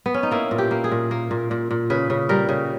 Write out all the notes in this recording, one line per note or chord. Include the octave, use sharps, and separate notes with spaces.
B3
C#4
D#4
A#3 E4
A#2
G4
A#3
G#4
A#2
A#3
A#2
A#2
A#2
C#3 B4
C#3
G3 A#4
C#3